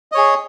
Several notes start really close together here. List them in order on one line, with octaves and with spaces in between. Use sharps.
D#5 C#5 G#4